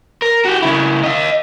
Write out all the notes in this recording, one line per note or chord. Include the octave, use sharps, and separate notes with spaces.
A#4
F#4 G4
C#3 E4
D#5 F5